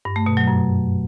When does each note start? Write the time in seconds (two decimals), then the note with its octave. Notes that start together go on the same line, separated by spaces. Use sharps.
0.05 G2
0.16 A3
0.26 B2
0.37 F#3
0.48 F#2